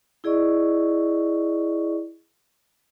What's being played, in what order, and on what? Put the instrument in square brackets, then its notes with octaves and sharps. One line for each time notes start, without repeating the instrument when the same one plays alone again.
[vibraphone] E4 G#4 D5 D#5 C#6